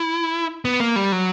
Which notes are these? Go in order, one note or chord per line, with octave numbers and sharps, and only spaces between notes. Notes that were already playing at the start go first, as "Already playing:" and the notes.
Already playing: E4
B3
A#3
G3
F#3